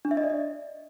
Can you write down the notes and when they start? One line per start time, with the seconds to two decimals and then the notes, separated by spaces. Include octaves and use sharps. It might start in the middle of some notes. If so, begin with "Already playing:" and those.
0.05 D4
0.11 E5
0.17 D#5
0.23 D5
0.30 D#5